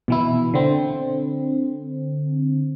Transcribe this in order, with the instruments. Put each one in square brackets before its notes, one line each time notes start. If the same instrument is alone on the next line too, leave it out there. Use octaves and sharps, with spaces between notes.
[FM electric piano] B2 E3 E4
D3 C4